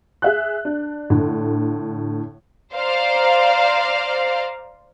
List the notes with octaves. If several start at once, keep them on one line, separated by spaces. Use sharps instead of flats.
G#4 E5 F#6
D4
A2 D3
C5 D5 F5 A#5